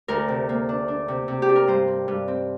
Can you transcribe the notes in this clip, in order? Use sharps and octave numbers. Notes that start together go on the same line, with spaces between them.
D2 A#4
C3
A#3
D4
D4
C3
C3
G4
D4
A#4
G2 C5
C4
G2
C4